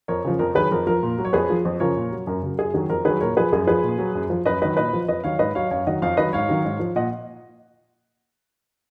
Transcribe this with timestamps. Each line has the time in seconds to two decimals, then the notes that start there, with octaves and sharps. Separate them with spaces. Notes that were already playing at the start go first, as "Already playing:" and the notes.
0.08 F2 A#4 C#5
0.25 C#3 F3
0.39 F2 A#4
0.55 D#3 F#3 G#4 B4
0.72 F2 A#4
0.87 F3 A#4
1.03 A#2
1.19 F#3
1.25 C#5
1.33 F2 G#4 B4
1.50 F3
1.65 F2
1.80 C#3 F3 A#4 C#5
1.97 A#2
2.12 F#3
2.27 F#2 A#4
2.42 C#3 F#3
2.59 F#2 G#4
2.74 D#3 F#3 G#4
2.90 F2 A#4
3.05 D#3 F#3 G#4 B4
3.20 A#2 A#4 C#5
3.37 F3 G#4 B4
3.52 F#2 G#4
3.67 F3 G#4 B4
3.84 A#2
3.99 F#3
4.15 F#2
4.30 F3
4.46 F#2 B4 D#5
4.62 D#3 F#3 B4 D#5
4.77 A#2 B4 D#5
4.93 F3
5.08 F2 B4 D#5
5.24 D#3 F#3 C#5 F5
5.39 G#2 B4 D#5
5.55 F#3 C#5 F5
5.71 F#2 C#5 F5
5.87 D#3 F#3 D#5 F#5
6.02 F2 C#5 F5
6.17 D#3 F#3 B4 D#5
6.33 G#2 C#5 F5
6.49 D#3 F#3
6.65 G#2
6.80 F3
6.96 A#2 D#5 F#5